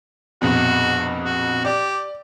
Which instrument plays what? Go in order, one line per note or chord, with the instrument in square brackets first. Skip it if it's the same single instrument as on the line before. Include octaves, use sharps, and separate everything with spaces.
[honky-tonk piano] A#1 F2 B2 [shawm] F#4
[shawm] F#4
[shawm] G4 [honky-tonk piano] D5